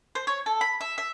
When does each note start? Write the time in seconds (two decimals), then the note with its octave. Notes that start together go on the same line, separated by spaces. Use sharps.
0.15 C5
0.27 C#5
0.46 A4
0.61 B5
0.81 E5
0.98 E5